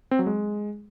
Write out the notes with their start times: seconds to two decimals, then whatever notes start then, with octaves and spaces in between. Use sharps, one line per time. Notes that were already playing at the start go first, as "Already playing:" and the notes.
0.11 C4
0.19 F#3
0.26 G#3